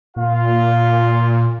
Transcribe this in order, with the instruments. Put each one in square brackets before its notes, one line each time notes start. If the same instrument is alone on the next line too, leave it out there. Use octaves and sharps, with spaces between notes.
[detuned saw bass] A#2 [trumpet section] F4 F5